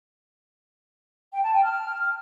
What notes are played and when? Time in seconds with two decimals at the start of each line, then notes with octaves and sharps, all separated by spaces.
1.32 G5
1.43 A5
1.53 G5
1.63 F6